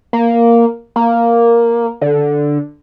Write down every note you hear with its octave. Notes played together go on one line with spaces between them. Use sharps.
A#3
A#3
D3